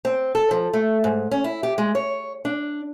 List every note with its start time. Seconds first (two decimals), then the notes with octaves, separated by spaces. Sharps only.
0.05 C4
0.35 A4
0.51 F3
0.73 A3
1.04 G#2
1.31 C#4
1.44 E4
1.63 G4
1.78 G#3
1.95 C#5
2.45 D4